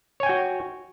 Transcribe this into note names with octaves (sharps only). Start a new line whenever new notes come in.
F#4 C#5 G5 G#5